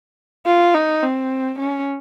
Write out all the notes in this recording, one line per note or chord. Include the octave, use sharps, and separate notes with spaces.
F4
D#4
C4
C#4